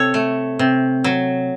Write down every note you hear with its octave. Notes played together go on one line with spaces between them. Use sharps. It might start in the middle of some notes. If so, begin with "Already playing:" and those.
Already playing: C3 A4 C#5
A3
C3
F#3